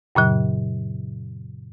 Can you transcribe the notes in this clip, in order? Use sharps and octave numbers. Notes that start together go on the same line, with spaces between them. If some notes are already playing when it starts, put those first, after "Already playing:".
F#2 A#2 C#3 F#3